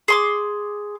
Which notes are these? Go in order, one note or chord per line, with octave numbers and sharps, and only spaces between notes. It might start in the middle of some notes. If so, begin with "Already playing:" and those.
G#4 C6 D6